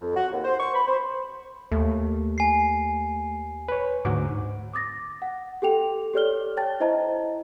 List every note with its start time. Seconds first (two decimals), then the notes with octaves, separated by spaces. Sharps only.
0.02 F2
0.17 F#4
0.32 D#2
0.44 C5
0.60 C#6
0.75 B5
0.88 C5
1.72 D#2 A3
2.38 G#5 C7
3.68 B4 C#5
4.05 D2 G#2 F#4 D6
4.73 D6 D#6 A6 A#6
5.22 F#5
5.62 G4 A4 G5 F7
6.13 G4 A4 C#5 D5 F6 G7
6.57 C#5 G5 A5 A6
6.80 E4 C5 D#5 E5 A5 A#5